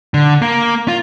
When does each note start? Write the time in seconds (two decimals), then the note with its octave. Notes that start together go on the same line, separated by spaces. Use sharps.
0.14 D3
0.42 A#3
0.88 F4